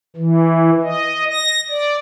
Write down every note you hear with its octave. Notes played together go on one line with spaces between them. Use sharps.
E3
D#5
A#6
D5